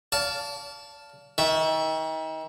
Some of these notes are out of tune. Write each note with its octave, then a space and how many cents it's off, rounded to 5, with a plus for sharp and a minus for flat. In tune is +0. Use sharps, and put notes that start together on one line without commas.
D5 -40 F5 +5 A5 +0
D#3 +35 E5 +0